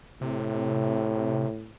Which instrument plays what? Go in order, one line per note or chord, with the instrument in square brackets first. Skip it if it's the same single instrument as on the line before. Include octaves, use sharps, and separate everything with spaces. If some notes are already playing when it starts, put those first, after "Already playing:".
[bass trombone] A2 [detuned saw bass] C3